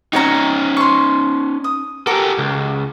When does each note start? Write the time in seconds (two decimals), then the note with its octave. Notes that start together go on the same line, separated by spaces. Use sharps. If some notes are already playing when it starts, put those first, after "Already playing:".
0.13 C#4 D#4 F#4 C#5 A#5
0.77 C6 C#6
1.64 D#6
2.07 F#4 G4 A4 A#4 D6
2.38 C#2